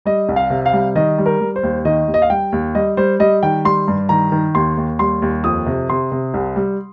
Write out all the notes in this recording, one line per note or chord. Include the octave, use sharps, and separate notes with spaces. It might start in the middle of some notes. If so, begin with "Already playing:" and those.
G3 D#5
C2
F5
C3
F5
G3
D#3 D#5
G3
A#4
G3
C5
D#2
D#3 D#5
D#2
D#5
F5
G3 G5
D#2
G3 D#5
G3 C5
G3 D#5
D#3 G5
G3 C6
G2
D#3 A#5
D#3
D#2 C6
D#2
G3 C6
D#2
F2 D#6
C3
C3 C6
C3
C2
G3